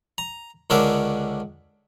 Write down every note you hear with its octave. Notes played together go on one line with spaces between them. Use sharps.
A#5
C#2 D3 C#4 D4 A#4 E5